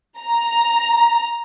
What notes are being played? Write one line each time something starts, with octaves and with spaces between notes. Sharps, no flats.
A#5